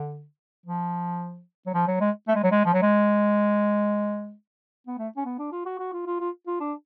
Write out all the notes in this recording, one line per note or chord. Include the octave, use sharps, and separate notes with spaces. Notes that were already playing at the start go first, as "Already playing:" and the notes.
Already playing: D3
F3
F#3
F3
F#3
G#3
A3
G#3
F#3
G#3
F3
F#3
G#3
B3
A3
C#4
B3
D4
F4
F#4
F#4
F4
F4
F4
F4
D4